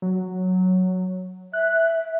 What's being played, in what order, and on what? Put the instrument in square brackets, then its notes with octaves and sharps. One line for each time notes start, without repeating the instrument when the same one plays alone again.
[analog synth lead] F#3
[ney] E5 [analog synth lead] F#6